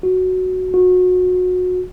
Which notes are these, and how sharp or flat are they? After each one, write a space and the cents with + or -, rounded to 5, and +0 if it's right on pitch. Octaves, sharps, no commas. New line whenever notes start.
F#4 +0
F#4 -25